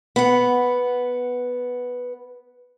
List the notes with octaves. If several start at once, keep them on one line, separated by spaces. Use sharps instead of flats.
B3 F#5